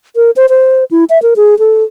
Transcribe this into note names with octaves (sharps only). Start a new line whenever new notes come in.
A#4
C5
C5
E4
E5
A#4
G#4
A4